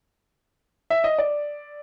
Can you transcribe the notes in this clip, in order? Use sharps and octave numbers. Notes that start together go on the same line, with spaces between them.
E5
D#5
D5